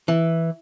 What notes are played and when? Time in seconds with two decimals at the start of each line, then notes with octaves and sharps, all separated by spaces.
0.08 E3